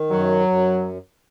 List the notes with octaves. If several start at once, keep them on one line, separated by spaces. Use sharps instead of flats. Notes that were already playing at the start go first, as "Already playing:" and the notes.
Already playing: D#3
F#2 F#3
F#2